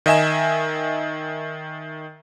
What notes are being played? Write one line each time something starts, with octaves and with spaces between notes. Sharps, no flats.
D#3 D#5 E5 G#5 E7